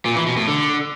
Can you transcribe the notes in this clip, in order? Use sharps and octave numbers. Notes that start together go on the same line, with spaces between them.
A#2
E3
B2
A2
D3